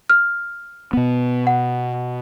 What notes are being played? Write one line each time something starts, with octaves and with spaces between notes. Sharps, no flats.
F6
B2 B3
F#5